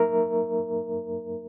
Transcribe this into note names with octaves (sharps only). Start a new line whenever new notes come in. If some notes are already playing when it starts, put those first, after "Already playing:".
Already playing: F#3 A#3 D#4 A#4 E5